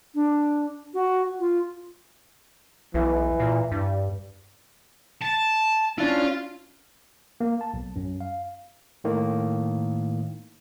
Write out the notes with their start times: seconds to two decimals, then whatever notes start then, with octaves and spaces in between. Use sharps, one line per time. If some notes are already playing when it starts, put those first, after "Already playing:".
0.15 D4
0.94 F#4
1.40 F4
2.94 B1 E3
3.40 A#2
3.72 G2
5.21 A5
5.98 C#4 D4 E4 F4
7.40 A#3
7.61 A5
7.74 B1
7.96 F#2
8.21 F5
9.04 A2 D#3 A#3